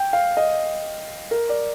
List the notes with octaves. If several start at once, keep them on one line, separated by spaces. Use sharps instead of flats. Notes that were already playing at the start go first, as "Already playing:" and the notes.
Already playing: G5
F5
D#5
A#4
D5